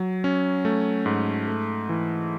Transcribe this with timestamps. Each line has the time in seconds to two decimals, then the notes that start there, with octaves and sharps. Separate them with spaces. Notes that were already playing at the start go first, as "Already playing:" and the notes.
Already playing: F#3
0.24 C#4
0.65 A3
1.06 G#2
1.48 A3
1.89 E3